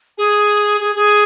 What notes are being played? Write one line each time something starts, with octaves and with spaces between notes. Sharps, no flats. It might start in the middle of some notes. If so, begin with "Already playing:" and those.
G#4
G#4
G#4